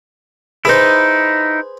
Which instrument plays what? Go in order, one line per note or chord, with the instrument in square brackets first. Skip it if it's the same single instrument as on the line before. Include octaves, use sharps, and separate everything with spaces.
[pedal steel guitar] D#4 E4 [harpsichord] G#4 B4 C5